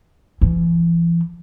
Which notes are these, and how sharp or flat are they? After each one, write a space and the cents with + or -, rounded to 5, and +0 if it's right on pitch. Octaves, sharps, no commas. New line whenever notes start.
E3 +40